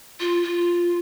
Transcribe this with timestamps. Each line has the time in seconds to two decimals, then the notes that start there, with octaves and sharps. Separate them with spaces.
0.20 F4
0.43 F4